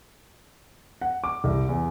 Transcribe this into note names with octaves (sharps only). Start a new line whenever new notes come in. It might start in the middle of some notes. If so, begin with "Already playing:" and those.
F#5
D6
C2
E2